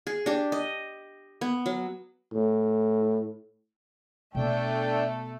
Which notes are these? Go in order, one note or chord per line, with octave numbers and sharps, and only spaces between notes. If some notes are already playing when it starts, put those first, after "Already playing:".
G#4
D4 G4
D#5
B3
F#3
A2
B2 A3 B3 D4 A4 G5